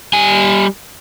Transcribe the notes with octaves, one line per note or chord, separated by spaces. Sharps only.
G3 G#5